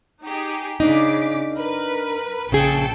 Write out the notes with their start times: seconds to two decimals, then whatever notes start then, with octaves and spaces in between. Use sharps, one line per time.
0.23 D#4 G4 G#4
0.80 C#3 D4 D#4 D6 B6
1.56 A#4 B4
2.52 A#1 C#3 G#4 A4 G5